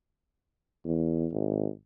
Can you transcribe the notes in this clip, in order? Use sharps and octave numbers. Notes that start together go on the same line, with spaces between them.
E2
G#1